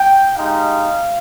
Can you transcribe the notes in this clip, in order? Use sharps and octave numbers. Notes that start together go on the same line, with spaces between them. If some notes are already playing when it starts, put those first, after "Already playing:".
Already playing: G5
G#3 D#4 G4 F5